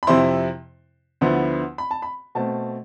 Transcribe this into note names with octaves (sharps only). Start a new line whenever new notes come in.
B5
F2 C3 F3 C4 E4 C6
D2 D3 F3 B3 E4
B5
A5
B5
B2 A3 C4 A5